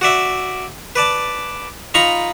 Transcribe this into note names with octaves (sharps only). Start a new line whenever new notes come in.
F#4 D5 E5
B4 D5 A5
D#4 F4 A#5 B5 C#6